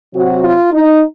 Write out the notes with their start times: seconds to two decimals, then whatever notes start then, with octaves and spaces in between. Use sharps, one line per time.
0.14 C3 F#3 C4 F#4
0.43 F4
0.72 D#4